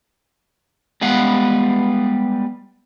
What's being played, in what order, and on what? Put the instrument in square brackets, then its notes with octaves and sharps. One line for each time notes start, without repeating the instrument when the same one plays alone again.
[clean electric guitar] G3 G#3 B3 B4 F5 F#5